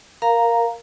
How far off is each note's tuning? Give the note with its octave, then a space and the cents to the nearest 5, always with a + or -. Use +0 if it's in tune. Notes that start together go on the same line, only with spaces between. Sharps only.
A#4 +0 F5 +0 A#5 +0